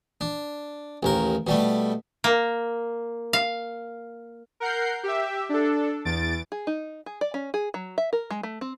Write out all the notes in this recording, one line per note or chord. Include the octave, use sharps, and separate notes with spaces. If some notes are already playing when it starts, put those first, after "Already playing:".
D4
A1 D#2 A#4
B2 G3 A3
A#3
F5
A#4 F#5 G6 C7
G4 E5
D4 A4
E2 A6 D7
G#4
D#4
G#4
D5
C#4
G#4
F#3
E5
A#4
G#3
A3
C4